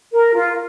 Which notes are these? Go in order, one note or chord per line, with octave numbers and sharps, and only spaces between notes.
A#4
F4